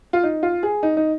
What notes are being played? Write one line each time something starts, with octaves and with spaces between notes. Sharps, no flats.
F4
D#4
F4
G#4
D#4
D#4